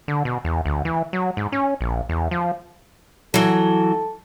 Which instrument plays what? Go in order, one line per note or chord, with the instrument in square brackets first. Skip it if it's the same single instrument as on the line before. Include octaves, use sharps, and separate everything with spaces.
[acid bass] D3
B2
E2
D2
E3
F#3
G#2
C#4
A#1
E2
F3
[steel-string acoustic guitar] E3 F#3 [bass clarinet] A4